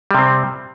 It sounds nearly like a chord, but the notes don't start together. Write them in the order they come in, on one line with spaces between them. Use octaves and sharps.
G3 C3 C4